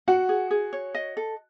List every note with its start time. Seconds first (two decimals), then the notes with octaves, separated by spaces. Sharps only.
0.08 F#4 F#5
0.29 G#4
0.51 G#4
0.73 C#5
0.95 D#5
1.17 A4